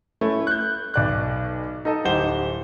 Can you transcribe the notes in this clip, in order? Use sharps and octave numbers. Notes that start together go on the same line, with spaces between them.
A3 C#4 E4
F#6 G6
B1 D5 F#6
D#4 A4 D#5 A5
D1 D#4 G4 C5 F#5 G7